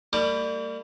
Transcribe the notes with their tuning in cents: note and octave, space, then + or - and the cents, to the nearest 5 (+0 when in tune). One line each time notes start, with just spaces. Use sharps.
G3 +15 A#3 -40 D6 +15